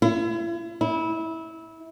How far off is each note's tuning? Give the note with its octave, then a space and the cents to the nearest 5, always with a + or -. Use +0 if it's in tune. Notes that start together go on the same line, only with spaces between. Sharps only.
E4 +40
E4 -20